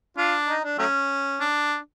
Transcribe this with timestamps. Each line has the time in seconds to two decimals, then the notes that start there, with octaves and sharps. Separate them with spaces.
0.17 D4 F4
0.49 D#4
0.64 D4
0.78 F#3 A3 C#4
1.41 D4